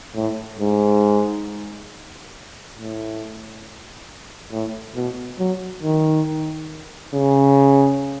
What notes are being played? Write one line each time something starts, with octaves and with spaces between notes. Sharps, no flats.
A2
G#2
A2
A2
B2
F#3
D#3
C#3